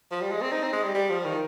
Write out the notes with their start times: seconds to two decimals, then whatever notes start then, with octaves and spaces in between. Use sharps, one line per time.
0.11 F3
0.21 G3
0.32 G#3
0.41 C4
0.52 D#4
0.63 C4
0.73 G#3
0.84 G3
0.95 G3
1.10 F3
1.25 D#3